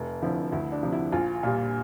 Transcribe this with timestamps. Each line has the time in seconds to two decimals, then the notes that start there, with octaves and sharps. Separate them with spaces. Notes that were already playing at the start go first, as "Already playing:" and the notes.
Already playing: F1
0.22 F2 D3 F3 E4
0.52 D2 E4
0.72 D4
0.83 C3 F3
0.92 E4
1.12 A#1 F4
1.43 A#2 G3